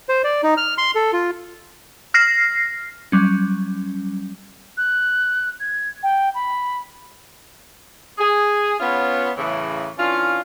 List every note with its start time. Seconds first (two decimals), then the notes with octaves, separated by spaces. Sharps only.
0.09 C5
0.24 D5
0.43 D#4
0.57 F6
0.78 C6
0.95 A4
1.13 F4
2.14 F6 A#6 C7
3.12 F#3 G3 C#4
4.77 F#6
5.60 G#6
6.03 G5
6.35 B5
8.18 G#4
8.80 B3 C#4 F4
9.36 A2 C#3 E3
9.98 E3 C#4 D4 F4